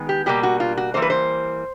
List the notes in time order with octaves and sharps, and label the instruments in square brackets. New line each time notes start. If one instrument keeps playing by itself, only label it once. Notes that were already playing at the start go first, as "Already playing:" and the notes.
Already playing: [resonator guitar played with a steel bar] D#3 G#3 B3
G4
B2 G3 A#3 G4
F#4
F4
F#4
E3 G3 A#3 C5
B4
C5